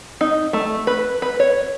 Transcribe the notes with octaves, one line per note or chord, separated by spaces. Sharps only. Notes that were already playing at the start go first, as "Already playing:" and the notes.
D#4
A3
B4
B4
C#5